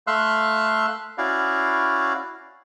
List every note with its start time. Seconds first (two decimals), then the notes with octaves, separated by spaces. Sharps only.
0.07 A3 E5 F5 C6 E6 F#6
1.18 C#4 E4 F#4 D5 F5